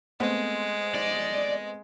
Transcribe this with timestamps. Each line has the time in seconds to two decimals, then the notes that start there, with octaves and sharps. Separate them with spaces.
0.20 G#3 A3 B3 C4
0.94 D5 D#5